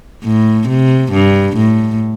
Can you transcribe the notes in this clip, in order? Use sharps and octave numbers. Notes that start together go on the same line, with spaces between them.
A2
C3
G2
A2